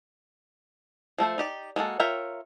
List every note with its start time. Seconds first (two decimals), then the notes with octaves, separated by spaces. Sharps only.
1.18 F3 A3 A4 C5
1.38 D#4 G4 D5
1.76 G#3 A#3 F#4 A4
2.00 F4 A#4 C#5 E5 G5